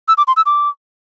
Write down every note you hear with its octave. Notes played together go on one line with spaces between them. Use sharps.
E6
D6
C6
E6
D6